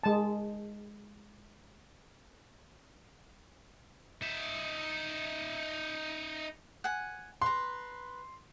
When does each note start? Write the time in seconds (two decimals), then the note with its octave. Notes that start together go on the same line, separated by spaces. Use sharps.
0.03 G#3 A5
4.22 D#4 E5
6.84 F#5 G#5
7.42 B4 A#5 C6